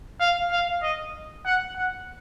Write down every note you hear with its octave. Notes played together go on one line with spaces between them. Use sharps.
F5
F5
D#5
F#5
F#5